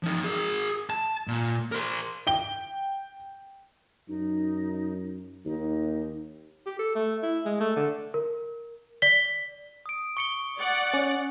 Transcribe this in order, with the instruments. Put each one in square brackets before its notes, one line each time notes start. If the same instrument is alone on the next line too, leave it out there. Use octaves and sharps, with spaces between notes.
[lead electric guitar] F3 D#4
G#4 A#4
A5
A#2
A#4 C5
[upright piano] G5 G7
[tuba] F#2 [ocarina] D#4
[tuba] D#2 [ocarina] D#4
[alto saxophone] G4
A4
A3
E4
G#3
A3
D3
[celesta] A#4
D5 B6 G7
[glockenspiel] D#6 D7
C#6 C#7 G7
[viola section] D5 F#5
[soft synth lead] C#4